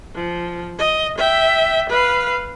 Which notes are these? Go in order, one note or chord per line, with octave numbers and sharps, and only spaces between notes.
F3
D#5
E5 G5
B4 F5